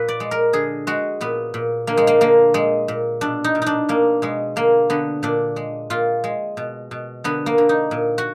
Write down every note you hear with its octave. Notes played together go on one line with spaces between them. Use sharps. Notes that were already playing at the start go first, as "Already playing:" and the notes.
Already playing: A#2 B4
D5
G#3
A#4
D3 G#4
G#3 F#4
A#2 B3
A#2
D3 A#3
G#3
A#3
D3 A#3
A#2 G#3
A#2
B2 D4
D#4
B2
D4 D#4
B2 A#3
B2 G#3
D3 A#3
D3 B3
A#2 D4
G#3
A#2 F4
G#3
B2
B2
D3 B3
A#3
D3
D#4
A#2
F#4